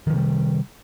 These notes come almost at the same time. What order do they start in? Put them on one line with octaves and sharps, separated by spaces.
D#3 F3 C3 G3